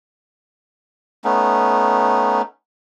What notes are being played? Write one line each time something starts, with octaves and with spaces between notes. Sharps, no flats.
A3 B3 C#4 D#4